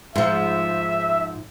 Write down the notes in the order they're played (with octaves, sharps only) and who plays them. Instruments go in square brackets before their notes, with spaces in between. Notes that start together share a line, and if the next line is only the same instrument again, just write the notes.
[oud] G#2 F3 [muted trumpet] E5